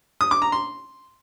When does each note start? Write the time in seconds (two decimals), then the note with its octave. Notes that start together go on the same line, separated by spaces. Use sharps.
0.21 D#6
0.31 D6
0.42 A#5
0.52 C6